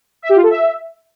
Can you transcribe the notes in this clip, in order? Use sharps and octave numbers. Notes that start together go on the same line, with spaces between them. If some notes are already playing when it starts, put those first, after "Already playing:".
E5
G4
F4
A4
E5